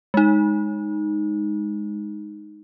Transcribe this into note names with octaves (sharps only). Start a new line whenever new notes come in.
G#3 D#4